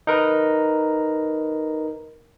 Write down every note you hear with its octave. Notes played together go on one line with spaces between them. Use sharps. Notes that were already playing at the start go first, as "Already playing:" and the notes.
D#4 A#4 B4